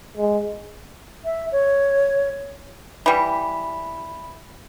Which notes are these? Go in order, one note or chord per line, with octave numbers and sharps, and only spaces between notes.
G#3
E5
C#5
E3 G3 B5